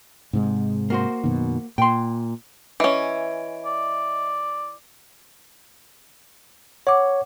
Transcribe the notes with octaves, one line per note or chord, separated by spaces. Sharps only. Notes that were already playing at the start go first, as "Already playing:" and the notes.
G#2 C3 G#3
A#3 F#4 C5
F#2 B2 D#3
A#2 G5 C6
E3 C#4 D#5 E5 D7
D5
C#5 F#5 D6